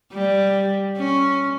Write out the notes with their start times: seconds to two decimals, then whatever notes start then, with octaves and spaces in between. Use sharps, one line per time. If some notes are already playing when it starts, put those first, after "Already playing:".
0.12 G3
0.97 C#4